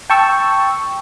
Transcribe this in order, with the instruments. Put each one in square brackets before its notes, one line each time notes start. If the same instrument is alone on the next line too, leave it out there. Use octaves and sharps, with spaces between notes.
[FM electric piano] G5 A5 C#6 E6